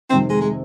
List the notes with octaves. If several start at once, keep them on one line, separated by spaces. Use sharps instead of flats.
F2 C3 D#3 C4
G#3
G#3